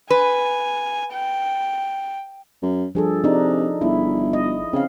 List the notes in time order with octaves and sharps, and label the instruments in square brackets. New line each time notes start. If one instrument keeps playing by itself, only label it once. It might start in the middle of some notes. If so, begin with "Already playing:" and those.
[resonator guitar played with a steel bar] B4 [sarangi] G#5
[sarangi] G5
[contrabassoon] F#2
[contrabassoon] G2 [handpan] F3 G#4 A4
[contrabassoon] C3 [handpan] D4 D#4
[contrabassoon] G1 [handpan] E4
[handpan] D#5
[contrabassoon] C#3 [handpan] C4 F5